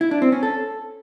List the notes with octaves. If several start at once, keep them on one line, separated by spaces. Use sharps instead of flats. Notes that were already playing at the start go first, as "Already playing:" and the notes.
E4
D4
C4
C#4
A4